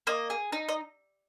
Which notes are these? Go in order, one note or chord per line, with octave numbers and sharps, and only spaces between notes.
A#3 D#5
G#4
D#4
D#5